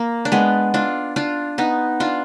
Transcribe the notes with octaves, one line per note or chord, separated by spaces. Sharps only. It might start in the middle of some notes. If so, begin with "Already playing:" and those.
Already playing: A#3
D4
G#3 B3
D4 F4
D4 F4
B3 D#4
D4 F4